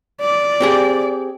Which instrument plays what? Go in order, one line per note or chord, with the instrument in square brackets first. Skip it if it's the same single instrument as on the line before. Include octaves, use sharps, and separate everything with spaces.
[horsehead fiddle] D5
[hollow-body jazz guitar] C4 G4 G#4